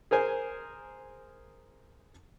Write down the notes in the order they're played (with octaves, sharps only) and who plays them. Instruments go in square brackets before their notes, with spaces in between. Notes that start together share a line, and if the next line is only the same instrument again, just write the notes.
[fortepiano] G#4 A#4 C5 G#5